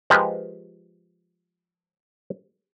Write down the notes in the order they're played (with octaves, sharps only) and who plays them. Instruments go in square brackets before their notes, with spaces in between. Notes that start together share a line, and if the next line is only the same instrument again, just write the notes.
[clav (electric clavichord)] F3 G#3 F4 G4 A#4 B4